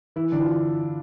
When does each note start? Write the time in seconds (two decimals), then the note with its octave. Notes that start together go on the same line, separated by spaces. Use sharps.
0.16 E3 E4
0.32 D3 D4
0.41 F4